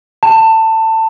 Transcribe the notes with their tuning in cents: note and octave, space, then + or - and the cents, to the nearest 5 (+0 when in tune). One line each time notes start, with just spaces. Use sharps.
A5 +20